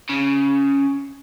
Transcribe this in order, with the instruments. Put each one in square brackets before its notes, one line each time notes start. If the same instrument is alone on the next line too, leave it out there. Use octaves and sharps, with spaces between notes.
[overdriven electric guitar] C#3